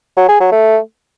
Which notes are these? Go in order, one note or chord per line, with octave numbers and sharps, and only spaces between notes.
F#3
G#4
F#3
A3